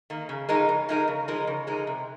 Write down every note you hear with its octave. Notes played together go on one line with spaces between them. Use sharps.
D#3 A#3
C#3
F3 G#3 D#4 A#4
C#3
F3 G#3 D#4 A#4
C#3
F3 G#3 D#4 A#4
C#3
F3 G#3 D#4 A#4
C3